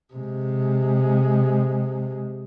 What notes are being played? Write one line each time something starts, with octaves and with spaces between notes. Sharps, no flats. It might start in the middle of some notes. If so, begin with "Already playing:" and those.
C3 G#3